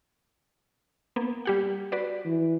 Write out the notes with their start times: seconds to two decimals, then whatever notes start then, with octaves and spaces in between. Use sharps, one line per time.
1.16 A#3 B3
1.45 G3 G4 F#5
1.92 F#4 B4 D5
2.26 E3